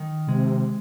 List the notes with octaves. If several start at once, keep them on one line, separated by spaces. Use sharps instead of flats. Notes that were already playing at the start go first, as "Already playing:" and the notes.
Already playing: D#3
C3 G#3